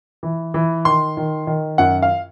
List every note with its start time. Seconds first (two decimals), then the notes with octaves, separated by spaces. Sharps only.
0.23 E3
0.54 E3
0.85 D#3 C6
1.17 D#3
1.47 D#3
1.78 F#2 F#5
2.02 F5